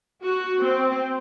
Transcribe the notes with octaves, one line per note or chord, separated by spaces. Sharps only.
F#4
C4